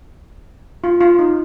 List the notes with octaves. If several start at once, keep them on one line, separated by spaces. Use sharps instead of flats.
F4
F4
D#4